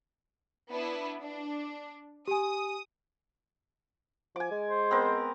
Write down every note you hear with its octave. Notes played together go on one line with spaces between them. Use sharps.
B3 D4 E4
D4
G4 G#5 D#6
F3 G#5 D6
G#3
C5
B3 C4 A#4